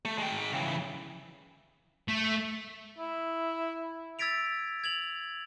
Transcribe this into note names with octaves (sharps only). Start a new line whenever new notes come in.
A3
G#3 G5
C#3 E3
A3
E4
E6 G#6 A6 B6 D7 F7
G#6 F7 F#7